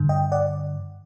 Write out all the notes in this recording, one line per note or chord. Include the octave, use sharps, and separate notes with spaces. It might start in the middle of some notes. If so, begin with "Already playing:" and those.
Already playing: G2 D3
D#5 G5
D5 F#5